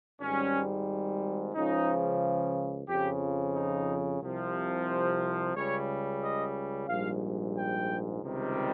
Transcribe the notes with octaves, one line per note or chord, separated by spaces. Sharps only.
G#1 G#2 G3 C#4
C#2 C#3 F3 D#4
F2 C#3 F3 G4
D#4
C2 C3 F3
C5
C#2 C#3 G3 C#5
D#5
A#1 G#2 G3 F5
G5
C#2 C3 D#3 G3